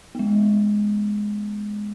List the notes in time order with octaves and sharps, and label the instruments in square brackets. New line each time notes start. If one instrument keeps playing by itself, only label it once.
[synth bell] G#3 B3